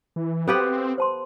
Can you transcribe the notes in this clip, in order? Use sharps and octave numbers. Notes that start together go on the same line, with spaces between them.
E3
B3 C4 G4 A4 B4 F5 D#6
C5 A5 C6